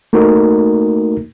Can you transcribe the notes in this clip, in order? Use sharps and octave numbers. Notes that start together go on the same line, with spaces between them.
A3 A#3 D#4 F#4 A#4